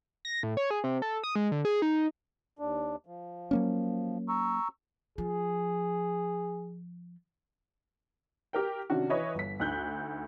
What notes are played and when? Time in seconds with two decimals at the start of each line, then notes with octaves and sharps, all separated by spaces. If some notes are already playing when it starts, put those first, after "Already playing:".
0.25 A#6
0.43 A2
0.57 C#5
0.71 G#4
0.84 C3
1.02 A4
1.24 D#6
1.36 G#3
1.52 D3
1.65 G#4
1.82 D#4
2.59 D#2 D4
3.06 F3
3.51 F#3 A#3 C#4
4.29 A#5 C#6 E6
5.18 F3 G#4
8.53 G4 A#4 G5
8.90 C3 D#3 C#4 D4 F#4
9.10 E3 B4 C#5 D#5 E5
9.35 G1 B6
9.60 D2 D#4 F#6 G6